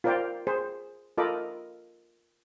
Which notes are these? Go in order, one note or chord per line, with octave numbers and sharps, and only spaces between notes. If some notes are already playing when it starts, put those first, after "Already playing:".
F4 A#4 C5 D5 F5 G5
G#4 C5
F4 A4 A#4 D#5 B5 D6